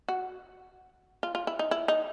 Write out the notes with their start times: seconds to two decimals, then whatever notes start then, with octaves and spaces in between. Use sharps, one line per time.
0.08 F#4
1.23 F4
1.35 F4
1.47 E4
1.59 D#4
1.71 E4
1.88 D#4